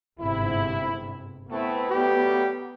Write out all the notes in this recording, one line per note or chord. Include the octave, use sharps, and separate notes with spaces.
G1 G#2 C3 E4
A3 B3 C4 E4
F#3 G3 A3 G4